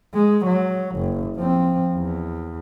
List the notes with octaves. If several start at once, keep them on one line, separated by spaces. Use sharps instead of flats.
G#3
F#3
F#1
F3 C4
E2